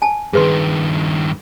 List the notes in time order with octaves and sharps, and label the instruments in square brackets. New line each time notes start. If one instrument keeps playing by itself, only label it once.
[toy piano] G#5 A5
[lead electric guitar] G2 D#3 [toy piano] G#4 B4 C6